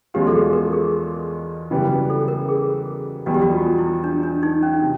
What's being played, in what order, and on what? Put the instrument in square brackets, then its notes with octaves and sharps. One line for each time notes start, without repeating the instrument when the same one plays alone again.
[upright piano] E2 B2 G#3 C#4 F4 [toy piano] G4
[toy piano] A4
G#4
A#4
G#4
[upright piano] F#2 C#3 E3 G3 B3
[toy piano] A4
A#4
G#4
[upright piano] E2 B2 G3 [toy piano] F#4
[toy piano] G4
F#4
F4
E4
D4
D4
D#4
C#4
[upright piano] C3